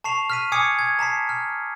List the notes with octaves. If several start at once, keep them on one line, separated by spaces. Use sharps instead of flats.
A5 C#6 C7 F7
F6 B6 D#7
G#5 D6 D#6 G#6 C7 C#7
G#6
A5 A#5 B6 C7
F6